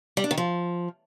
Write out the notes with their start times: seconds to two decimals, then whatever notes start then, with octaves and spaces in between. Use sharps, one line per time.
0.17 G3
0.24 D4
0.31 D#3
0.38 F3